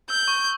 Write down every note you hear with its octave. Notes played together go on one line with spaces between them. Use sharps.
E6 G6
C#6